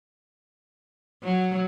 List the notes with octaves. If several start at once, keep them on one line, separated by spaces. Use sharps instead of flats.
F#3